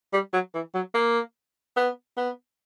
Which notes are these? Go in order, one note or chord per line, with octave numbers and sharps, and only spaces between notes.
G3
F#3
E3
F#3
A#3
B3
B3